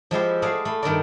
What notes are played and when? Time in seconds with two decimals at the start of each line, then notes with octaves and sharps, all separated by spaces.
0.11 F3 G#3 E4 G4
0.42 A3 E4 G#4 D5 F5 F#5
0.65 A3 B5
0.83 G2 D#3 A#4 D5